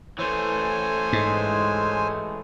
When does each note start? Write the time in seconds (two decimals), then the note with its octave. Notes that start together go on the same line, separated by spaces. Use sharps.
0.19 E3 A3 C5 C#5 G#5
1.13 G#2 G#3